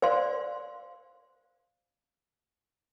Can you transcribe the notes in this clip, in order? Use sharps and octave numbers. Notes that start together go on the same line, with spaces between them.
C5 D5 F5 C6